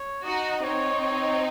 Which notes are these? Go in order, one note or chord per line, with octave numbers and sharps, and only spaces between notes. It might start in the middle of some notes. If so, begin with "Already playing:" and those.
Already playing: C#5
D#4 F#4 D#5
C4 D#4 C#5
C#5